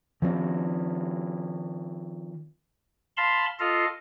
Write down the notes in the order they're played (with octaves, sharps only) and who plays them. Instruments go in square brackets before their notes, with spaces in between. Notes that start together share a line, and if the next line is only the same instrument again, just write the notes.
[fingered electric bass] D#3 F3 G#3 C4
[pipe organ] F5 A5 B5 C6
F4 A4 D#5 F5